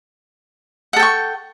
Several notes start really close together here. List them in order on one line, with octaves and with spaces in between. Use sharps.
F#5 A4 G5 C#6